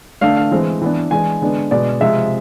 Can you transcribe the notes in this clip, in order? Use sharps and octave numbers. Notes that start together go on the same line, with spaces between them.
D3 A3 D4 F5
F5
E3 G#3 C4
E3 B3 D4
E3 G#3 D4 G#5
D3 G#3 B3 D4
B2 G#3 B3 D4 D5
C3 F3 G#3 E5